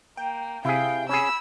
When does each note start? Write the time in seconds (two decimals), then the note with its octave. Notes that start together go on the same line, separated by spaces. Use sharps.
0.17 A#3 G5
0.65 C3 E4 G#4 F5 G5
1.09 C#4 G#4 B5 E6